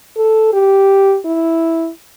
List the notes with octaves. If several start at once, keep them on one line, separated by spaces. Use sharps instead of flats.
A4
G4
E4